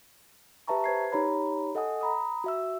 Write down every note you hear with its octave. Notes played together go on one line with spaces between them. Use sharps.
G4 B4 E5 A5 A#5 C#6
B4 C5 G#6 C7
D#4 G4 C#5 A#5 B5
A4 D#5 F#5 G#5 D#6
A#5 B5 D#6
F#4 E5 E6